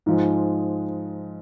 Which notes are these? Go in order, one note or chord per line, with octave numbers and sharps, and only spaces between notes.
G#2 F3 G#3